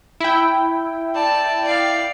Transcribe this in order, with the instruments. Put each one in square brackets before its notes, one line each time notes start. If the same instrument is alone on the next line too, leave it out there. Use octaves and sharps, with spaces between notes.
[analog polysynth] E4 G5
[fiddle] D5 A5
D5 F5